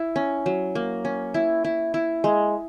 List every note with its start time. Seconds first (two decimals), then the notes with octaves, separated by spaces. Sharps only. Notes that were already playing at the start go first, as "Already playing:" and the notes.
Already playing: E4
0.16 C#4
0.46 F#3
0.75 A#3
1.05 C#4
1.34 E4
1.64 E4
1.94 E4
2.24 G#3